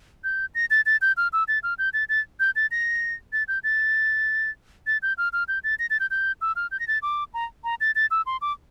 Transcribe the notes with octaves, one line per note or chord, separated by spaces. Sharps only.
G6
A#6
A6
A6
G6
F6
E6
A6
F6
G6
A6
A6
G6
A6
A#6
A6
G6
A6
A6
G6
F6
F6
G6
A6
A#6
A6
G6
G6
E6
F6
G6
A#6
A6
D6
A#5
A#5
A6
A6
E6
C6
D6